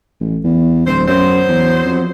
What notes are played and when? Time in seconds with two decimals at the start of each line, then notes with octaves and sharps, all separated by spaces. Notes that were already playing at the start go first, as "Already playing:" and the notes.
0.21 A1
0.44 E2
0.87 D1 C5
1.08 F#2 F#3 B3 C5
1.48 E2
1.85 F2